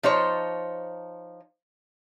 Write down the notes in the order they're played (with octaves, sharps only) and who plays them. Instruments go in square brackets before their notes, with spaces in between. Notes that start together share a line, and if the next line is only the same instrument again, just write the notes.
[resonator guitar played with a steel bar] F3 D#4 C5 C#5